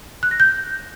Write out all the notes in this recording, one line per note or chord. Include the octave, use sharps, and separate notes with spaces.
F#6
A#6
G6